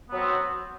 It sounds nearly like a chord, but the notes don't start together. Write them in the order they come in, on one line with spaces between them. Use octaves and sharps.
B3 F#3 C4